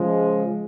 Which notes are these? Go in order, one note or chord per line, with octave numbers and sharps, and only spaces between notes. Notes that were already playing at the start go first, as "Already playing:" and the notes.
Already playing: C#3 F3 G#3